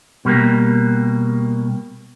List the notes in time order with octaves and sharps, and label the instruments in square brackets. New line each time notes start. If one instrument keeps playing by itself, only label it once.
[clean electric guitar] B2 G3 A#3